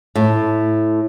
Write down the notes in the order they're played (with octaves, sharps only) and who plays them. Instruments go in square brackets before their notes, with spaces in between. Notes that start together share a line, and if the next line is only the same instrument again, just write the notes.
[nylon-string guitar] A2